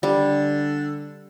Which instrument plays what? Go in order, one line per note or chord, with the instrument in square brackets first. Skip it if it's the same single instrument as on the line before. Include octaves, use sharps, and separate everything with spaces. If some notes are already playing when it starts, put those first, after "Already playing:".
[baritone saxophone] D3 [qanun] G3